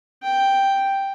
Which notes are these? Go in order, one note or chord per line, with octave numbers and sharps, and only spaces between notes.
G5